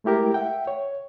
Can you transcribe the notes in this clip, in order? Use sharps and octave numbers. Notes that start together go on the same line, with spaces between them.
G#3 A3 E4 G4 A#4
E5 F#5 G5
C#5